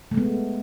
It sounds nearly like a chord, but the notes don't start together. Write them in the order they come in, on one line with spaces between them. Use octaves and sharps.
A3 G#3 B3